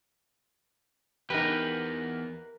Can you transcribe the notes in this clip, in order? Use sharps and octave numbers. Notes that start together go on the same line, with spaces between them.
E2 D#4 G4 A#4 B4